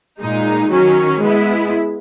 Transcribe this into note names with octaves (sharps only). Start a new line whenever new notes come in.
A#2 G#3 D#4
D#3 F#3 C#4
G#3 B3 E4